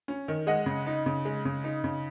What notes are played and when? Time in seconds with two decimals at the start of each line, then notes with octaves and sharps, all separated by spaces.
0.08 C#4
0.28 D#3
0.47 G#3 D#5 F#5
0.66 C#3
0.87 D#4
1.06 C#3
1.25 G#3
1.45 C#3
1.64 D#4
1.84 C#3